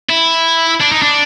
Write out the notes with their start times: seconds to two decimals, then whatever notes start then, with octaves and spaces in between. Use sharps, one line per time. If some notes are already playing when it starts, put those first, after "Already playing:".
0.09 E4
0.80 D4
0.92 D#4
1.02 D4